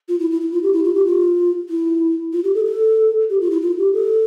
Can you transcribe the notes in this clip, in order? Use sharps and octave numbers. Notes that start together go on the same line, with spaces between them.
F4
E4
E4
E4
F4
G4
E4
F4
G4
F4
E4
F4
G4
A4
A4
G4
F4
E4
F4
G4
A4